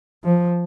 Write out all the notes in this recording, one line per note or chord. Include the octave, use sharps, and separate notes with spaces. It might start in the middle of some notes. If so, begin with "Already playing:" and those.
F3